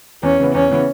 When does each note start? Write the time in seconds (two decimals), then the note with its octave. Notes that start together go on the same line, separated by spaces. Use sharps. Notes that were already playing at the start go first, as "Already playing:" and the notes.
0.23 E2 C#4
0.40 C#3 E3 B3
0.54 E2 C#4
0.70 C#3 E3 B3